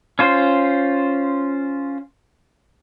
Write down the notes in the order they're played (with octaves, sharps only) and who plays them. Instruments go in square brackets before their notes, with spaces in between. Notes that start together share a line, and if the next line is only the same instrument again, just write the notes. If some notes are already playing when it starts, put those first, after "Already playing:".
[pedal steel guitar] C#4 F4 C5